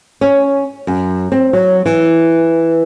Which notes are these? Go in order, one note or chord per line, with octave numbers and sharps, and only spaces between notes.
C#4
F#2
C4
F#3
E3